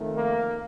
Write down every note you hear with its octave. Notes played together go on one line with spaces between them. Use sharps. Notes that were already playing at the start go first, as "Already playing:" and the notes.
Already playing: F2 D#3 A3
A#3